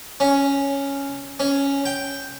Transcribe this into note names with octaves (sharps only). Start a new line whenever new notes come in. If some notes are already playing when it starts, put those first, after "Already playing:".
C#4
C#4
G5